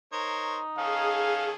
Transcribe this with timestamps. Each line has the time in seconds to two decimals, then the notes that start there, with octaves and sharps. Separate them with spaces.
0.13 D#4 A#4 C5 C#5
0.78 D#3 C#4 G#4 A4 F5